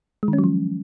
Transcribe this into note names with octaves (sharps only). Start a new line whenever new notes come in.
G#3
D#3
C#4
F#3
F3